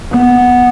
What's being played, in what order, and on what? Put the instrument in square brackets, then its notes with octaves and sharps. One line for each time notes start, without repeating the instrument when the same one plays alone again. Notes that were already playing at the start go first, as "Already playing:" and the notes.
[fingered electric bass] B3